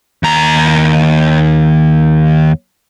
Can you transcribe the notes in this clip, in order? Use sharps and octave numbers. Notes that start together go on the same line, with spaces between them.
D#2 A#5